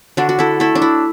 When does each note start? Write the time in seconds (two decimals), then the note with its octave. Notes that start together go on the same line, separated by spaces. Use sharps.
0.17 D3 D4 F#4
0.29 F#4
0.39 E4 A4
0.60 A3 E4 A4
0.75 D4
0.82 E4